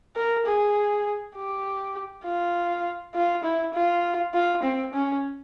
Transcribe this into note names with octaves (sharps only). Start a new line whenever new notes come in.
A#4
G#4
G4
F4
F4
E4
F4
F4
C4
C#4